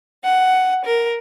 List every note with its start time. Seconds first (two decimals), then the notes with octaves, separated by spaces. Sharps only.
0.23 F#5
0.83 A#4